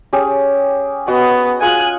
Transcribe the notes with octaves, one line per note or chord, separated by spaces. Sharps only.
C#4 G4 G#4
B3 F#4 D#5
F4 G#4 F#5 G#5 F#6